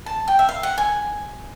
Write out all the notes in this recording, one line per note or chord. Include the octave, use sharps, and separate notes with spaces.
A5
G5
E5
F5
F#5
G#5